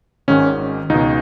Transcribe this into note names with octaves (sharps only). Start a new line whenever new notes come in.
G#1 G#2 D#3 C#4
C#2 B2 D#4